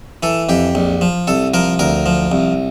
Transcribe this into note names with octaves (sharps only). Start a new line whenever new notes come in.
E3 A4
F2 G4
A#1
F3
C2 A4
F3 A#4
D2 A#4
F3
C2